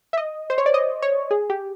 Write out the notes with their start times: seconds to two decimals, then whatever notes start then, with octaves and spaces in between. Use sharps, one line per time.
0.13 E5
0.17 D#5
0.50 C5
0.58 C#5
0.66 D5
0.74 D#5
1.02 C#5
1.31 G#4
1.50 G4